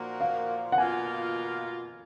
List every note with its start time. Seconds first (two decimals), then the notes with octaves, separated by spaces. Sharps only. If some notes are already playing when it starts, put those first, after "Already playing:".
Already playing: A#2 F3 A#3 D#4 F#4
0.20 F5
0.72 F#5
0.78 B2 A#3 F4 G#5